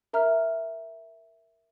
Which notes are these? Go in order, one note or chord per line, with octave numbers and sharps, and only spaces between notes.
A#4 E5 A#5 F6